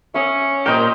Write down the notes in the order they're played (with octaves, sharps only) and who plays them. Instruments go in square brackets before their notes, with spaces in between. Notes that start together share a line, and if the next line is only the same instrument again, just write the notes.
[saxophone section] C#4 [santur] E5 D#6
[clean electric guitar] A#2 G4 [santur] A#4 C5 D#5